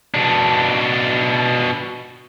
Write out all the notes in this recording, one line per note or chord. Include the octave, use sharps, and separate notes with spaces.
B2 D4